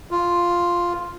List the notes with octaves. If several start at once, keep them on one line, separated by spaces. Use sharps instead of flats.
F4